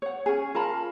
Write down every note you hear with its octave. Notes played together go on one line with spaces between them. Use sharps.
C#5 F#5
C#4 G#4
F4 A#4 A5 B5